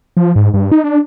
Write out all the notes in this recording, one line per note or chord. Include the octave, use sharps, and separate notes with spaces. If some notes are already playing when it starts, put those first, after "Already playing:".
F3
G#2
G2
D#4
D4